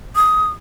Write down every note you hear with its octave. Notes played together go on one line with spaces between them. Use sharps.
D#6